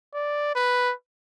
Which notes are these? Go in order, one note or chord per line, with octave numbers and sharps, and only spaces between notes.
D5
B4